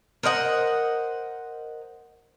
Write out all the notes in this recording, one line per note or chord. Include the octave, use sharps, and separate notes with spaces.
A#4 C5 D#5 F#5